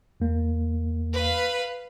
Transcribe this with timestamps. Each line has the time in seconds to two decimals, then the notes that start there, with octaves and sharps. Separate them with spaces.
0.20 E2 A#3
1.14 B4 F5